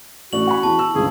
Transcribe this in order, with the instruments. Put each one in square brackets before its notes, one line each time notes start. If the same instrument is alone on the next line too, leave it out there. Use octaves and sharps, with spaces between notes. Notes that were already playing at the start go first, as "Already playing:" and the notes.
[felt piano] A1 A3 D5 [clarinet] F#4 [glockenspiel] F#7
[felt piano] F#5 G#5 B5
[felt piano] E2 [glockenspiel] A5
[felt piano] E6
[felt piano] G1 C#2 [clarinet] G#4